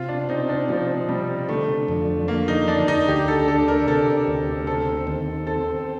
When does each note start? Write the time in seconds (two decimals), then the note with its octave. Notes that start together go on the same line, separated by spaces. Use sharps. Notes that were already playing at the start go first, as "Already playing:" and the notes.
Already playing: C3 F4
0.09 D4
0.29 C4 D#4
0.49 D4
0.69 C3 F3
1.09 C3 G3
1.49 D3 A3
1.88 F2
2.28 D3 A#3
2.48 D#4
2.68 D3 D4
2.88 D#4
3.08 D2 G4
3.28 A4
3.48 D4 A4
3.68 A#4
3.88 C3 A4
4.27 D2
4.67 C4 A4
5.07 D#2
5.47 C4 A4